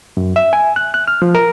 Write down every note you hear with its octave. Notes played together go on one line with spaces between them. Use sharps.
F#2
E5
G#5
F#6
F#6
F6
F3
A#4